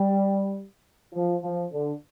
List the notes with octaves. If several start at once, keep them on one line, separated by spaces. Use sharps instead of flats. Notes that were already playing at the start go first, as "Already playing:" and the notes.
Already playing: G3
F3
F3
D3